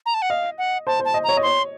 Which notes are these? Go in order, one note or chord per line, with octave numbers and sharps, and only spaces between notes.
A#5
A5
F#5
D#5 F5
F#5
C5 A5
C5
A5
D#5
A#5
C#5
D#5
C#5 C6